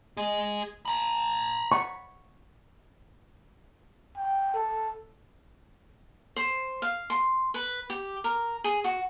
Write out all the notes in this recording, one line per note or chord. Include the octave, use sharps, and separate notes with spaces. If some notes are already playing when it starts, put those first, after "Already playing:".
G#4 D#5
A#5 B5
C#6
G5
A4
C5
F5
C6
B4
G4
A#4
G#4
F#4